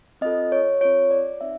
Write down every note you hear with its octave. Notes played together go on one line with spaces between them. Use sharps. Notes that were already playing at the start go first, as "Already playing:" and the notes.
C4 F4 A4 D#5
C#5
C4 F4 A4 C#5
D5
C4 D#4 E5